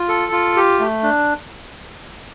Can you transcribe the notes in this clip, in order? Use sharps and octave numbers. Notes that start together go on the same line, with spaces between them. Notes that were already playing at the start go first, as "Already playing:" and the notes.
Already playing: F4
A4
F4
G4
A3
D4